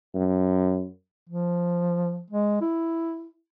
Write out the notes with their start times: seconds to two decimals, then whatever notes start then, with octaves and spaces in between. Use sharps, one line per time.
0.15 F#2
1.29 F3
2.30 G#3
2.61 E4